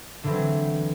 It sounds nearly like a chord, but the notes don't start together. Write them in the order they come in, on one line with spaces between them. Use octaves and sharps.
D3 E3 C4 F#3